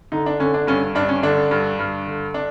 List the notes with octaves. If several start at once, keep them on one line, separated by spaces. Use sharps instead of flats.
D3 D#4
D4
D3 C#4
D4
G2 C#4
G2 D4
C#4
D3 D4
G2
G2
D3
D4